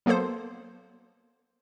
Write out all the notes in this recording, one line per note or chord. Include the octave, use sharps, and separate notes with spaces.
F#3 A#3 B3 A4 C5